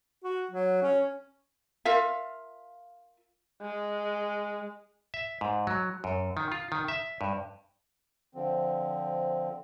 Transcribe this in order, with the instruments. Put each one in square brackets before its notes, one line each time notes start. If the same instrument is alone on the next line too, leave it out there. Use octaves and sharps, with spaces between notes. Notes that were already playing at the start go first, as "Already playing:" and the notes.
[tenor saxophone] F#4
F#3
C#4
[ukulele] F4 A#4 E5 F5
[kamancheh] G#3
[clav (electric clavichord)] E5
G#2
F#3
F#2
D#3
F4
D#3
E5
G2
[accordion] D3 F3 C4